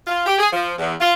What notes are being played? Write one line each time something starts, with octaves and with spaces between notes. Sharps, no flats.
F4
G4
G#4
F3
E2
F4